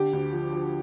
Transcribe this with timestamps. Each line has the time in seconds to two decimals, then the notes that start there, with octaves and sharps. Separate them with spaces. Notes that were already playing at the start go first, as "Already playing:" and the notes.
Already playing: D3 G4
0.13 D2
0.32 F3
0.52 F3